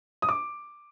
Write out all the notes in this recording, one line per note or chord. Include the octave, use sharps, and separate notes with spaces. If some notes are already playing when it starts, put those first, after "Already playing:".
D#6
D6